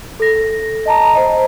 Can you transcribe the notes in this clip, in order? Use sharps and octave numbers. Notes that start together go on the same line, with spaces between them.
A4 A#6
D#5 A5 A#5
C5 D#5